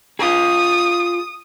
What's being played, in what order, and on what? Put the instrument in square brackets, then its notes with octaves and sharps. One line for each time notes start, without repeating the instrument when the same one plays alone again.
[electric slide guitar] F4 G#4 [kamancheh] D#6